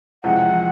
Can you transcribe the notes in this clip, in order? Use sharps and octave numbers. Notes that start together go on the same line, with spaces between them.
E2 C3 F3 G#3 F#5